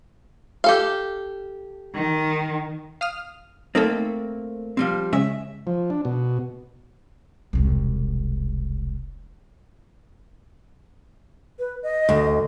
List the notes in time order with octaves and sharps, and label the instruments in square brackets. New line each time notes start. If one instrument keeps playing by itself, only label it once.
[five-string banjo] G4 A4 F5
[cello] D#3
[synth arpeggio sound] F5 D#6 F6
[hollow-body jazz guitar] A3 A#3 C4 [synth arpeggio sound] D#4 A4
[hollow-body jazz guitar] F3 G3 C4
[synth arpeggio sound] C#3 G#3 C#4 [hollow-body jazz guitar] E5
[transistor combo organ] F3
D4
B2
[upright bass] E1 C2
[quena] B4
D#5
[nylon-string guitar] D2